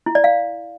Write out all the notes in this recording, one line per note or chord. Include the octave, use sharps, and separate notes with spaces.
E4
D5
F5